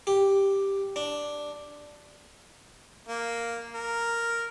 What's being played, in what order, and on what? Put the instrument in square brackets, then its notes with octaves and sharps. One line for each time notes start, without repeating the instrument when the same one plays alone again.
[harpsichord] G4
D4
[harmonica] A#3
A#4